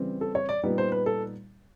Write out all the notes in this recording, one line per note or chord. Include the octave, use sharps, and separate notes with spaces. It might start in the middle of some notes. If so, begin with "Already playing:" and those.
Already playing: C#3 E3 G3 C4
A4
C#5
D5
A#2 G3 B3 D#4
C5
B4
A4